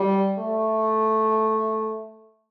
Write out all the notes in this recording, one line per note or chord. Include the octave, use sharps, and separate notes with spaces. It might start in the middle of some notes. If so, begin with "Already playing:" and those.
Already playing: G3
A3